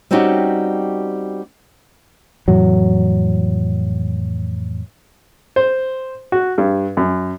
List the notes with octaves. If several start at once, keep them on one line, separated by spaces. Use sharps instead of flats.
G3 C4 C#4 D#4 F#4 G4
F2 A2 E3 F#3
C5
F#4
G2
F#2